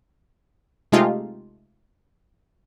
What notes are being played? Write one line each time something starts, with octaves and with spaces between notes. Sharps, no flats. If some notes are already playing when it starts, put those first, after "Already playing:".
C3 G#3 A3 D#4 F4 G4